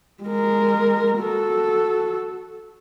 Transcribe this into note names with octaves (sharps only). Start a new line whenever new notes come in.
G#3 A#4
F#4 A4